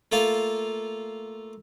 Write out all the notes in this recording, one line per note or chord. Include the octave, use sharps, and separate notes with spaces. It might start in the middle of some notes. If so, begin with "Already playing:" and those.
A3 A#3 F4 A4 F5